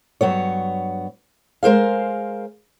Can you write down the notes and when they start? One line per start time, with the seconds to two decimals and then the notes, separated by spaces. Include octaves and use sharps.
0.21 G2 F#3 B3 C#5
1.63 G#3 A#4 C5 F5